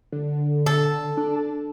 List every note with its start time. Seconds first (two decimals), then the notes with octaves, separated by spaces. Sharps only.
0.12 D3
0.66 A4
1.17 D4